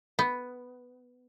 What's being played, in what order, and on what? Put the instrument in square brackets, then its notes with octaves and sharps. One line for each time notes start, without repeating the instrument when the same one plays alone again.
[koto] B3